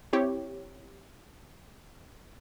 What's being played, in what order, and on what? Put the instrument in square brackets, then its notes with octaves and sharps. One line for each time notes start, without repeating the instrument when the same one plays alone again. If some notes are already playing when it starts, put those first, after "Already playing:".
[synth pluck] C4 E4 G4 C#5